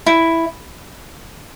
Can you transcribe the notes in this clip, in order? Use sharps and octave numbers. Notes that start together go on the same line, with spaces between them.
E4